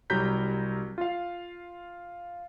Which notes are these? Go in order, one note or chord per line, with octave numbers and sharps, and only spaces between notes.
C2 F#3 G3 A#5 G6 B6
F4 F5